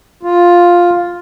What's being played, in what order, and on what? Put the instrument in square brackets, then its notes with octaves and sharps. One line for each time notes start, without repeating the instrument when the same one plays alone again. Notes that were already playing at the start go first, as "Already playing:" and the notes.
[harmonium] F4